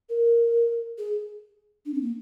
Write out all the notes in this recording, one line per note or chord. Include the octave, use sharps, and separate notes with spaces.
A#4
G#4
D4
C4
A#3